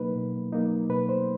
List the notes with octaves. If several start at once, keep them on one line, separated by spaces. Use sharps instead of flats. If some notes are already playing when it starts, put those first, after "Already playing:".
Already playing: B2 F#3 A#3 D#4 B4
B2
F#3 A#3 D#4
B2 B4
C5